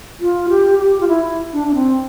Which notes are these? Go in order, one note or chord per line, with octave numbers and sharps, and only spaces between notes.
F4
G4
G4
F4
E4
D4
D4
C4